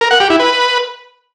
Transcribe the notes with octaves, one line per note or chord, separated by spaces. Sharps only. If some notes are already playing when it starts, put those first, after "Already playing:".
A#4
F#5
G4
E4
B4